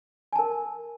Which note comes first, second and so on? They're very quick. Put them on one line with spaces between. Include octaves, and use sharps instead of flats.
G#5 A5 A#4